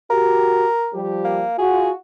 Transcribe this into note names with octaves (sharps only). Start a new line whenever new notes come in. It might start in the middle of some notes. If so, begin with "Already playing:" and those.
F#4 G4 A#4
F3 G3 G4
A#3
F4 F#4 G#4